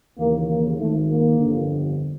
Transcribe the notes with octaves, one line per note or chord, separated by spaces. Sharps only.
D#2 C#3 E3 A#3
A#3
G#1 G#2 D#3 A3
A#3
G1 F2 D3